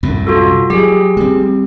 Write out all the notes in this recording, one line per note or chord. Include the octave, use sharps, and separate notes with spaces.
C2 F#2 A2
F4 F#4 A4
F#3 G4 G#4
G3 C4